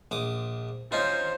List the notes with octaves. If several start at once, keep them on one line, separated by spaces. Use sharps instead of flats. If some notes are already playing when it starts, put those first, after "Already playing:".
A#1 D6 D#6
C#4 D#4 F4 C5